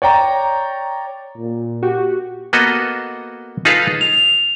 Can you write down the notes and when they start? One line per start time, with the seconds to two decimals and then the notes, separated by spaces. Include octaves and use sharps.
0.02 C#5 D5 G5 A#5
1.38 A#2
1.83 F#4 G4
2.53 A#3 B3 F#4 A4 D#5
3.65 D#4 F4 G#4 A4 B4 F5
4.01 F7